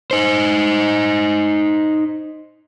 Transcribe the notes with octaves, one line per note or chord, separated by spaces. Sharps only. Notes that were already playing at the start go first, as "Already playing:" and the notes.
D#4 C5